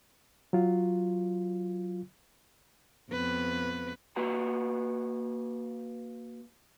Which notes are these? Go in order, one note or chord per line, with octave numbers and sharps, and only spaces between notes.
F#3 F4
F2 B3 B4
A#3 F#4 B4 F#5 A#5